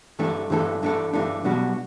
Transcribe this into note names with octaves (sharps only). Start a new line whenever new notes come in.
G2 E3 A3 D4 A4
G2 E3 A3 D4 A4
G2 E3 A3 D4 A4
G2 E3 A3 D4 A4
B1 B2 G3 D4 F#4